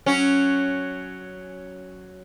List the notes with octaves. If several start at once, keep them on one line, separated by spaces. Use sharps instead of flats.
F#3 C#4